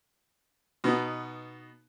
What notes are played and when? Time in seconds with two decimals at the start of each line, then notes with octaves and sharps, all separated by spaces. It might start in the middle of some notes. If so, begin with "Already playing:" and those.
0.84 B2 B3 D#4